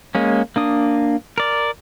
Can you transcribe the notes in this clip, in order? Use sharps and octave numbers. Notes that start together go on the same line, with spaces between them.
G#3 A#3 C#4
A#3 D4 D#6
A#4 D5